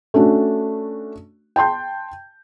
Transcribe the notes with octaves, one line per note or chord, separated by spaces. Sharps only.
A3 C#4 D4 F#4
G5 A5 C6 G6